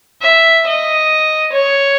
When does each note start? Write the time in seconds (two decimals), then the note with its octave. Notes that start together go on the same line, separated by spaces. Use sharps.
0.22 E5
0.66 D#5
1.53 C#5